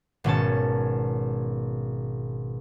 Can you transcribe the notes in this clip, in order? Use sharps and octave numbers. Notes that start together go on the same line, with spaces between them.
G#1 B2 C#4 A5